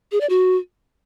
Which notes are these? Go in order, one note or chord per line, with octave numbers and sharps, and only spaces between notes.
G#4
D5
F#4